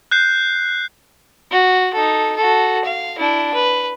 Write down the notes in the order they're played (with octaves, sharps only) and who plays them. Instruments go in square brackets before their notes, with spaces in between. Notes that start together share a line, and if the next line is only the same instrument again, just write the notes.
[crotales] F#6 G6 C7
[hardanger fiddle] F#4
D#4 A4
F#4 A4
F5
D4 E4
B4